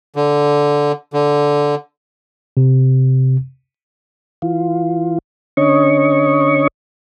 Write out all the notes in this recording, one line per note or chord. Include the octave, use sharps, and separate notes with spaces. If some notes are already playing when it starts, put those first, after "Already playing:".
D3
D3
C3
E3 F4
D3 C#4 C#5 D#5 C#6